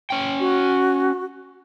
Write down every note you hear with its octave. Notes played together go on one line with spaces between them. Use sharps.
C#4 G5
F#4